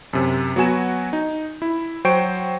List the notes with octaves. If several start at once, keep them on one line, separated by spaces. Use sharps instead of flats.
F#2 C3
F#3 B3 F#4 G#5 E7
D#4
E4
F#3 C5 G5 C#6 D7